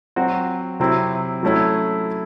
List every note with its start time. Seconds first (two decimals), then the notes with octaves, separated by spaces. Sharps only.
0.16 F#3 C4 F#4
0.80 C3 F#3 C4 E4
1.43 F#3 A3 C#4 E4